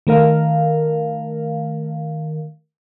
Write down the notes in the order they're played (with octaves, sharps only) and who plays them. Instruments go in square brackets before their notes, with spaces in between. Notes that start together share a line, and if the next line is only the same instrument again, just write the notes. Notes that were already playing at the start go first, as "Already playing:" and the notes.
[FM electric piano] D#3 A3 A#4 F5